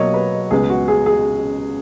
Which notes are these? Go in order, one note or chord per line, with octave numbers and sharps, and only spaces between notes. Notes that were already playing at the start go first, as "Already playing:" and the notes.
Already playing: B2 F#3 A#3 C#5 D#5
B4
C#2 C#3 G#3 B3 G#4
F#4
G#4
G#4